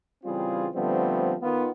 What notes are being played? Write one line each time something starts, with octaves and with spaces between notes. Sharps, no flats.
C#3 E3 G3 C4 F4 G#4
D3 F3 G3 A3 B3 C4
D#3 B3 F4